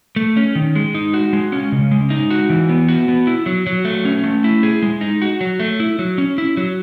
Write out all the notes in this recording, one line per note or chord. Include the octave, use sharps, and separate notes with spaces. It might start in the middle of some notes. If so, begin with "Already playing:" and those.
A3
C#4
D#3
G#3
D#4
F#4
G#3
C#4
C#3
G#3
D#4
F#4
E3
B3
F#4
B3
E4
F#3
F#3
A3
C#4
A3
E4
G#4
G#3
D#4
F#4
F#3
A3
E4
F#3
C#4
E4
F#3